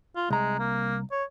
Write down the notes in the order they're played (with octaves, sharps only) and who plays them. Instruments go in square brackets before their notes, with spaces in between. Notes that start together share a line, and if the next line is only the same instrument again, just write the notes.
[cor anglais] F4
[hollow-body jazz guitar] C2 A#5 [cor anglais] G#3
[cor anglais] A#3
C#5